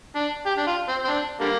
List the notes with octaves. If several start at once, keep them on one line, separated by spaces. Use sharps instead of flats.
D4
G4
D4
F4
C4
C4
D4
D3 G3 A#3